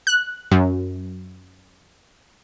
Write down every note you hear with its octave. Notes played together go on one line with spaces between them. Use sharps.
F#6
F#2